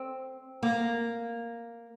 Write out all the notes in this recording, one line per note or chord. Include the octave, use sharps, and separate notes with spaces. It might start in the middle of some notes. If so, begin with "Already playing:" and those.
Already playing: C4
A#3